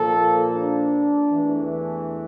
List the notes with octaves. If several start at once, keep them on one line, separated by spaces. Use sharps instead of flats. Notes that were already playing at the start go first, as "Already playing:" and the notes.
Already playing: A#2 F3 A#3 A4
D4
E2 E3 A3